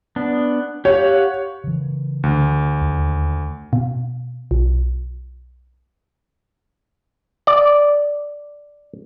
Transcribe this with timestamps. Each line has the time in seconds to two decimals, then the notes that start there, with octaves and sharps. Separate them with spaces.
0.16 B3 D4
0.85 G4 C#5 F5 F#5
1.64 C#3 E3
2.23 D2
2.81 D#2
3.73 B2
4.51 B1
7.47 D5